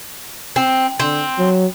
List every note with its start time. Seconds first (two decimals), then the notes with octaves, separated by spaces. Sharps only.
0.56 C4
1.00 D3 C4
1.38 F#3